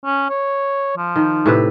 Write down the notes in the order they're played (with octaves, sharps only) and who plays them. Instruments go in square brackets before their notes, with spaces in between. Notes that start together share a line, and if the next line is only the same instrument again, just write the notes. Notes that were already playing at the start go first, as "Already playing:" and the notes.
[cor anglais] C#4
C#5
F3
[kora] D#3
A2 C3 B4